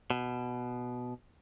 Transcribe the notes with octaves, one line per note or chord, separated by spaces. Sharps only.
B2